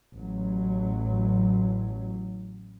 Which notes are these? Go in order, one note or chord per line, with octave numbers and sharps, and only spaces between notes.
A1 F#3